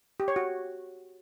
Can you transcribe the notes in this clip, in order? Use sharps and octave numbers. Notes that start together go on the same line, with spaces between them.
G4
C#5
F#4